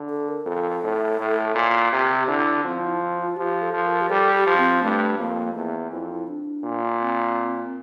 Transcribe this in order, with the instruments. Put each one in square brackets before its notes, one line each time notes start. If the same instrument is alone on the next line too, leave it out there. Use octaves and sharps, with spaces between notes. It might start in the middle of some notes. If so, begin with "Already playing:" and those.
Already playing: [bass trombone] D3
[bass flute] A4
A#4
[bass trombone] F2 [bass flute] A4
[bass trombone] A2
A2
A#2
[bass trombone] C3 [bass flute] G4
[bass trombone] D3 [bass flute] E4
[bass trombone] F3 [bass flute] C4
[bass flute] E4
F4
F4
[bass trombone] F3 [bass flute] G4
[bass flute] A4
[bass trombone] F3
[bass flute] A#4
G4
[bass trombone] G3 [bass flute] A4
[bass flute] G4
[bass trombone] F3
[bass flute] C4
[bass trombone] G2 [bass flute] A3
[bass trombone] F2 [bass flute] A#3
[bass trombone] E2 [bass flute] A#3
[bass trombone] F2 [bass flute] E4
[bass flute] E4
D4
[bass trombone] A#2
[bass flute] C4